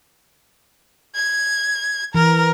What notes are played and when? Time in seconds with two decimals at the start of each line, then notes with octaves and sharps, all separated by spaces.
1.15 G#6
2.15 E3 A#4